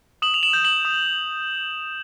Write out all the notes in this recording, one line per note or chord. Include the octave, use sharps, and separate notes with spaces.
D#6 E7 F#7
F7
E7 F#7
G6
E7 F#7
D#6